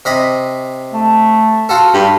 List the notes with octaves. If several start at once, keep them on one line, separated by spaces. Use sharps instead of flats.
C3 D#5 B5
A3
F4 F#4 A4
G2